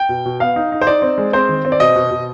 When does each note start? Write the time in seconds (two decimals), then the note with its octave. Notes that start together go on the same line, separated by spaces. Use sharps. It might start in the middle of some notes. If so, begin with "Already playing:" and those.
Already playing: G5
0.09 B2
0.25 B2
0.40 B3 F5
0.56 D#4
0.72 D#4
0.81 C5
0.87 D#4 D5
1.02 C4
1.18 G#3
1.33 C4 C5
1.49 D#3
1.65 C4
1.72 D5
1.80 B2 D#5
1.96 B2
2.11 B2